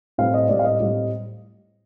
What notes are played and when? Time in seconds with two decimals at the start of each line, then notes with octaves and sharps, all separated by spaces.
0.18 A2 G3 C4 F5
0.34 D#5
0.49 A2 G3 C4 D5
0.59 F5
0.65 D#5
0.80 A2 G3 C4